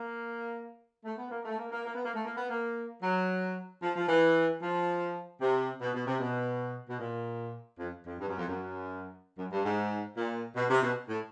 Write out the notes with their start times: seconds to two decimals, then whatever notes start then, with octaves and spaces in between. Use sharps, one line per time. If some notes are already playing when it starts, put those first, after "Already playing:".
Already playing: A#3
1.05 A3
1.17 B3
1.31 A#3
1.45 A3
1.58 A#3
1.72 A#3
1.85 A#3
1.94 B3
2.04 A#3
2.14 A3
2.24 A#3
2.37 B3
2.50 A#3
3.03 F#3
3.82 F3
3.96 F3
4.08 E3
4.62 F3
5.40 C3
5.81 B2
5.94 B2
6.07 C3
6.20 B2
6.89 B2
6.99 A#2
7.79 F2
8.05 F2
8.19 G2
8.28 F#2
8.38 F2
8.47 F#2
9.37 F#2
9.51 G2
9.64 G#2
10.16 A#2
10.56 B2
10.70 C3
10.82 B2
11.09 A2